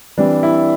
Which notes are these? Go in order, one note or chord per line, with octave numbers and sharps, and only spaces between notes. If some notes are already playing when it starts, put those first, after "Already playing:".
E3 G3 C4 D4
E4